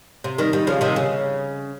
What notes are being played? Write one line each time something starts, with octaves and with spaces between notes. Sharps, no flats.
C3
D#3 G3
D#3 G3
C#3 F3
C3 D#3
C#3